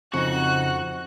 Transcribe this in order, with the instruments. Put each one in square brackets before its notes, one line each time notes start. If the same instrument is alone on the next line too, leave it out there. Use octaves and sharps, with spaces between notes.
[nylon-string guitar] F2 [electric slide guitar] C#3 D#4 [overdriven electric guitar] F#4 [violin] F#6